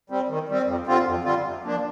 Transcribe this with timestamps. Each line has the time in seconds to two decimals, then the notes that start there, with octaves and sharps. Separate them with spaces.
0.10 G3 C4
0.29 D#3
0.49 G3 C4
0.67 F2
0.87 D3 G3 C4 F4
1.06 F2
1.25 D3 G3 C4 F4
1.44 C3
1.63 F3 A#3 D4